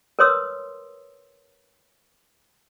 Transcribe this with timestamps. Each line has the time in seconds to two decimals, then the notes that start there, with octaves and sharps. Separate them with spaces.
0.19 A#4 B4 C#5 C6 D#6 E6